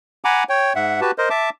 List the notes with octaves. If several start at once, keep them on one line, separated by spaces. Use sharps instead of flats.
F#5 G#5 A#5 B5 D6
C#5 G5
G#2 E5 F#5
F#4 G4 B4 A5
A#4 C5 D#5
E5 A5 D6